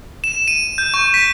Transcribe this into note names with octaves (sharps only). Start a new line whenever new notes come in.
E7
D#7
G6
C#6
B6